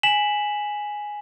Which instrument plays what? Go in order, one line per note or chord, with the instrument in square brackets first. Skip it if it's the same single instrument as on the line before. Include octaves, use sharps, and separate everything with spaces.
[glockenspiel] G#5 B6 E7 F#7